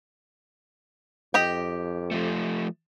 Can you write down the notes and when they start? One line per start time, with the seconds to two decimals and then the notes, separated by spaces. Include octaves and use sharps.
1.34 F2 G4 D#5 G5
2.11 F3 A3